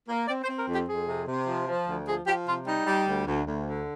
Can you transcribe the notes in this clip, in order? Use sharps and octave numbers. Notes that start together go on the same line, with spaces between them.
A#3
C4 D5
C5
C4
A#4
F2
G4
F2 G#4
C3
C3
F3
F3
D2
F3 G#4
F3 G4
C3 F4
G3 D#4
G3
D2
D2
D2
D3